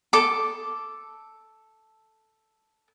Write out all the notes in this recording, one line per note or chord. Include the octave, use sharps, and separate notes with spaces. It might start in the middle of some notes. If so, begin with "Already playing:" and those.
A4 D6